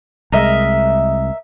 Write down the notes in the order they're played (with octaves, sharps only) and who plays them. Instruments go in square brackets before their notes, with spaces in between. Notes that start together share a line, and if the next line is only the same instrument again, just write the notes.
[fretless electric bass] C2 G#3 [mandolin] A#4 D#5 E5